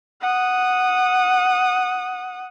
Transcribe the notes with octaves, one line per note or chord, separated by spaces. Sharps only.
F#5 D#6